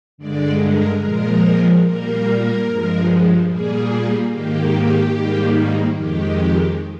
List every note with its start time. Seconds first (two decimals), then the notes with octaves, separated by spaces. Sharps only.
0.18 G2 D3 G#3 D5
0.60 A#4
1.00 A#2 F3 G#3 A#4
1.82 A#2 G3 A#3 A#4
2.65 G2 F3 G#3
3.47 A#2 G3 A#3 G#4
4.30 G#2 D#3 A#3 G4
5.12 G#2 D#3 G3 A#3
5.94 F2 D#3 G#3 G4